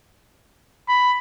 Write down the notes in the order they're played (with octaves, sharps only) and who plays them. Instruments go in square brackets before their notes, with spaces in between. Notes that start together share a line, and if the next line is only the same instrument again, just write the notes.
[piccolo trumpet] B5